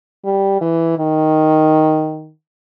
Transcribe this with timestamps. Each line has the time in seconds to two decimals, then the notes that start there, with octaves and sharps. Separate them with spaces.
0.25 G3
0.61 E3
0.98 D#3